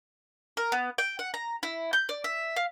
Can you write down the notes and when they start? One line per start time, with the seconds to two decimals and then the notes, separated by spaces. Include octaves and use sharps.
0.57 A#4
0.72 B3
0.98 G5
1.19 F#5
1.34 A#5
1.63 E4
1.93 G6
2.09 D5
2.24 E5
2.56 F5